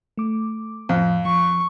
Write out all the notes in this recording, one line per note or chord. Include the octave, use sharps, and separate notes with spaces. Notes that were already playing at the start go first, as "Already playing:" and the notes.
A3 D6
F2 A2 F3 C5
F3 C#6